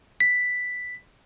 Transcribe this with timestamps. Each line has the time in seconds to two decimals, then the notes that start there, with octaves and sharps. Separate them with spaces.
0.20 B6